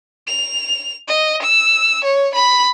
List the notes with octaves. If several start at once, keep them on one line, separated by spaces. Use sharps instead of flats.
F7
D#5
E6
C#5
B5